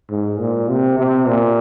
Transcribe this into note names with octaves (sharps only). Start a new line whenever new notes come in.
G#2
A#2
C3
C3
A#2